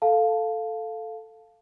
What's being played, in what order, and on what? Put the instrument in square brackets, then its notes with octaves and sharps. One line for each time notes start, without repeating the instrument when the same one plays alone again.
[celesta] A4 F5 A5